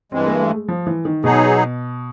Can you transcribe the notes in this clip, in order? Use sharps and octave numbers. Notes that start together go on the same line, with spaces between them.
G2 E3 G#3 C4
A#3
A3
G#3
F3
E3
D#3
B2 F#3 B3 D#4 G#4